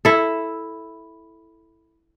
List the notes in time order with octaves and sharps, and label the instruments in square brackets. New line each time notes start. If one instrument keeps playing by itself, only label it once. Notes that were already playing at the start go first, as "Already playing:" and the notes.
[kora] E4 A4